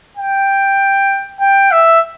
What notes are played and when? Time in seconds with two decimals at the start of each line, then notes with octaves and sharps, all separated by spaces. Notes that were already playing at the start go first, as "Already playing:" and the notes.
0.17 G5
1.40 G5
1.71 E5